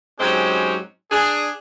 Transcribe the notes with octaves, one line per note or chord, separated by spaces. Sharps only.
G#2 F#3 G#3 C4 C#4 G4
D4 G#4